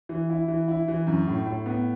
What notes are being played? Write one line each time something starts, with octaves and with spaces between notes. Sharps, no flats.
E3
E4
E3
E4
E3
F#2
A2
A2
B3